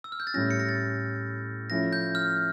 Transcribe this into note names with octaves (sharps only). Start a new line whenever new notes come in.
E6
F6
G6
A6
A2 G3 C#4 A#6
C#7
A#6
A6
F3 A3 C#4 E4 A#6
G6
F6